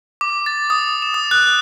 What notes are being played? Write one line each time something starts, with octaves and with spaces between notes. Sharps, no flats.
D6
A6
D#6
E7
D#6
F#6